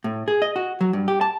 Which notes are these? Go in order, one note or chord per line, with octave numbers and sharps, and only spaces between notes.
A2
G#4
D#5
F#4
F#3
G2
G4
A5